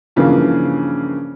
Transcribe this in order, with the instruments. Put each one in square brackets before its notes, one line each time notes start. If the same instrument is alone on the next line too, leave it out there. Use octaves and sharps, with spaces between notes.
[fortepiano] G2 C#3 E3 F3 A#3